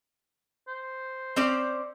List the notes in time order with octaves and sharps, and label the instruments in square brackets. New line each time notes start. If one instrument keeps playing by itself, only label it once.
[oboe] C5
[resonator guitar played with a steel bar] C4 C#4 D5